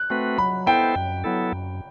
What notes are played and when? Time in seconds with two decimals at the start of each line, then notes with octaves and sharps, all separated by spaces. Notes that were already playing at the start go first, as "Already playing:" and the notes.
Already playing: F#6
0.10 A3 C4 F#4 B4
0.38 F#3 B5
0.67 B3 E4 A4 C5 G5
0.95 F#2
1.24 F#3 B3 E4 A4
1.52 F#2